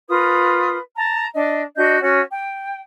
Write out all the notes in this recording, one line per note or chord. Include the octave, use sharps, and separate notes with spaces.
F4 A#4 B4 D#6
A5 A#5
D4 D#5
D4 F#4 D#5 G6
C#4 F#4
G5